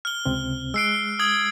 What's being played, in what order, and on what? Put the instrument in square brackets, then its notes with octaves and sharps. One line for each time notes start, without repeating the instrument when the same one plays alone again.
[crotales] F6 G7
[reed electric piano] C#2 C3 C4
[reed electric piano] G#3 F#6 [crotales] E6 C7 D7
[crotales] D#6 G#6 F#7